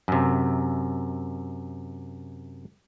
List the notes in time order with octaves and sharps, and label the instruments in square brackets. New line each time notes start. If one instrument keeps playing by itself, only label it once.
[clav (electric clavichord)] F#2 C3